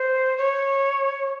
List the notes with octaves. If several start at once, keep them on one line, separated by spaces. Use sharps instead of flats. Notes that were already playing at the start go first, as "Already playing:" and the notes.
Already playing: C5
C#5